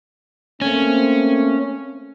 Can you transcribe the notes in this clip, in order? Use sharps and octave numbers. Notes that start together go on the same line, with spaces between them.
A3 A#3 C4 C#4